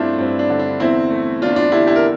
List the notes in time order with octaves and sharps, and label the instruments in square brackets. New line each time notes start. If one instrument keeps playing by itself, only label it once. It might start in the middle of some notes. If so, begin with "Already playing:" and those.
Already playing: [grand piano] G2 A3 C4 D4 E4 F4 A4 C5
G2 C4
D4
D3
D4
E2 C4 E4
A3
E2 D4 F4
D4 F4
D3 E4 G4
E4 G4
A#4